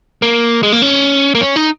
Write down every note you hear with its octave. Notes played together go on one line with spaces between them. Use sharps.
A#3
G#3
A#3
C#4
A#3
C#4
D#4